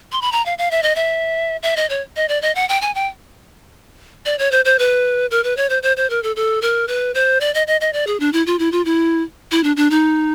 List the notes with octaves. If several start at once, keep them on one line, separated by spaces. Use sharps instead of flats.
C6
B5
A#5
F5
F5
E5
D#5
E5
E5
D#5
C#5
D#5
D5
D#5
F#5
G5
G#5
G5
D5
C#5
C5
C5
B4
A#4
B4
C#5
C5
C5
C5
A#4
A4
A4
A#4
B4
C5
D5
D#5
D#5
D#5
D5
G#4
D4
E4
F4
E4
F4
E4
E4
D4
D4
D#4